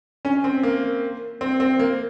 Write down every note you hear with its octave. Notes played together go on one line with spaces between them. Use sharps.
C#4
C4
A#3
C4
C4
A#3